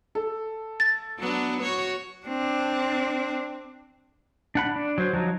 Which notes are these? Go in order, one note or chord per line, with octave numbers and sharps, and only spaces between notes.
A4
A6
F#3 B3 D4
F#4 C#5
C4 D4
D4 F#5 B5
D4
F#3 C5
F3 F#3 D#4